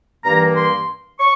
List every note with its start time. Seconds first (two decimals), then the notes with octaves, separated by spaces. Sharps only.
0.24 G2 E3 G3 A#3 A#5
0.56 C6
1.19 C#6